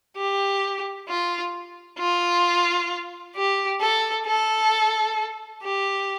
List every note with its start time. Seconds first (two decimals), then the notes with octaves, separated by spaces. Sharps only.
0.17 G4
1.08 F4
1.99 F4
3.35 G4
3.81 A4
4.26 A4
5.63 G4